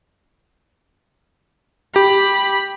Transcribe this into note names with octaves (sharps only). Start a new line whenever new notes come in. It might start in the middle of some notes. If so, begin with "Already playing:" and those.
G4 B5